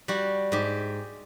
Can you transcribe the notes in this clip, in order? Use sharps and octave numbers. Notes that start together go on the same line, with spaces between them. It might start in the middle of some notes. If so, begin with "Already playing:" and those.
G3 F#4
G#2 G4